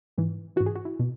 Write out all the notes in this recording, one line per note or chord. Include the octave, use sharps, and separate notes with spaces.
G#2 E3
G#2 E3 F#4
G#4
F#4
E4
B2